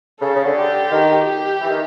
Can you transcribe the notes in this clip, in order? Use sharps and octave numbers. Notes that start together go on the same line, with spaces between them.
C#3 A4
C#3
D3
G4
D#3
G4
E3
D#3